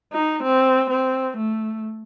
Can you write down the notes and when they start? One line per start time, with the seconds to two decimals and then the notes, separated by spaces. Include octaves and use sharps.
0.13 D#4
0.43 C4
0.90 C4
1.37 A3